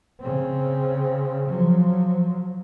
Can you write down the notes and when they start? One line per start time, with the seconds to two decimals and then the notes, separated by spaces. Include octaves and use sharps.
0.20 C#3 C4
1.49 F3 F#3